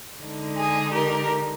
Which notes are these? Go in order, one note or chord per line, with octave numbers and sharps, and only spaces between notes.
D3 G#3 D#4
G#4
G4 A#4